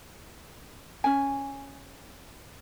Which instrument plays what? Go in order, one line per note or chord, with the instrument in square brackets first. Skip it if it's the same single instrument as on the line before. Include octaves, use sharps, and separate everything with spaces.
[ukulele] C#4 G#5